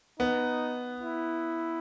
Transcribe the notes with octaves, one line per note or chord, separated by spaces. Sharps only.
B3 D#4
E4